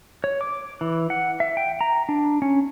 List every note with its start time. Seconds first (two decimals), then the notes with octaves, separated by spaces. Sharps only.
0.24 C#5
0.41 D6
0.81 E3
1.10 F#5
1.40 E5
1.57 G5
1.81 A#5
2.09 D4
2.42 C#4